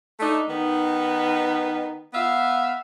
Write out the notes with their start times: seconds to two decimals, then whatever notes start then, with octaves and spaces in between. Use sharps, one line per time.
0.20 A3 D4 D#4
0.48 D#3 B3 D#4
2.13 B3 E5 F5